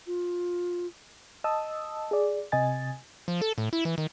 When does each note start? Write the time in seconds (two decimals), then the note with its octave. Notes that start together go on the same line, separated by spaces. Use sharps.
0.07 F4
1.44 D#5 A5 D#6 E6
2.11 G#4 D5
2.52 C3 D#5 G#5 A6
3.28 F3
3.42 A4
3.58 A2
3.73 E4
3.85 E3
3.98 D#3